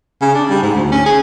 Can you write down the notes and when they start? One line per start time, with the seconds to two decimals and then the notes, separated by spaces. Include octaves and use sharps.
0.21 C#3
0.35 D4
0.50 G3
0.62 G#2
0.75 D2
0.92 C#4
1.06 G#4